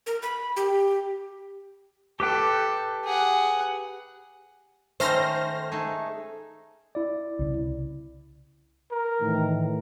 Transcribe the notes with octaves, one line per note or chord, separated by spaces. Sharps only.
A#4
B5
G4
G4 A4 B4 G5
G#4 F#5
D#3 A3 C#4 C5 F6 A#6
A3 D#4 G#4
E4 D5
C2 C#3
A#4
A2 D#3 E3